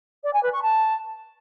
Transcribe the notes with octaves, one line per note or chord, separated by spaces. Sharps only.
D5
G#5
B4
C#6
A5